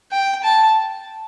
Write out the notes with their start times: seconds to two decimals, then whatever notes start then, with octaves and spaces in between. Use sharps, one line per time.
0.12 G5
0.44 A5